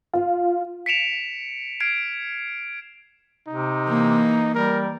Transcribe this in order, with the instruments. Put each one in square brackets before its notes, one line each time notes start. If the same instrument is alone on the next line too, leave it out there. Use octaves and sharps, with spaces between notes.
[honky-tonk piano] F4
[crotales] B6 C#7 D7 E7 F7
F6 G#6 C7 D7
[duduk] C3 [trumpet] D#4
[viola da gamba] E3 A#3
[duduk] G3 [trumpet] A#4